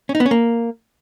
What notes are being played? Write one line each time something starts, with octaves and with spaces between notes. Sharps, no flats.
C#4
D#4
B3
C#4
A#3